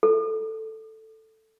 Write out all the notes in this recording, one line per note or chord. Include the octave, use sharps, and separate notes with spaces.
A4